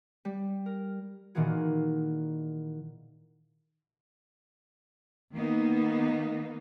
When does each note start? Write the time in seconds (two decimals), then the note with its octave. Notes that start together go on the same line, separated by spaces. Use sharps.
0.25 G3
0.66 A#4
1.35 A#2 D#3 E3 A#3 F#4 G#4
5.34 D#3 A#3 B3 D#4